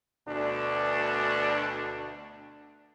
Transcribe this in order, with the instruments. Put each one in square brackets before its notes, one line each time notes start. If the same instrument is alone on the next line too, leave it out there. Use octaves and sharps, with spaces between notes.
[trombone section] D2 B2 D4